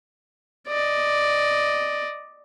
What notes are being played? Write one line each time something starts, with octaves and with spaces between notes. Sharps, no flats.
D5 D#5